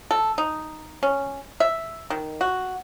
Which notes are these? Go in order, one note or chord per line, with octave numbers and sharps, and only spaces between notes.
A4
D#4
C#4
E5
D#3
F#4